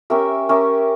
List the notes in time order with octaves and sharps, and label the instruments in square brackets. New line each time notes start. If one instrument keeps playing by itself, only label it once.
[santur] C#4 G4 A#4 E5
C#4 G4 A#4 E5